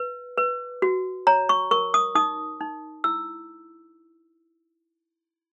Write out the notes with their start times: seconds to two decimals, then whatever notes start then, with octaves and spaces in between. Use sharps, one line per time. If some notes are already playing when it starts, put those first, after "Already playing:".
Already playing: B4
0.38 B4
0.82 F#4
1.27 C#5 A#5
1.49 C#6
1.71 A#4 C#6
1.94 D#6
2.15 D#4 D#6
2.61 D#4
3.04 E4 E6